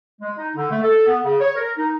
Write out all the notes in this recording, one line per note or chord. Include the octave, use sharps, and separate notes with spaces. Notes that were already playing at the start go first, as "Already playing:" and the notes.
G#3
D#4
D3
A3
A4
B3
C#3
C#5
A#4
D#4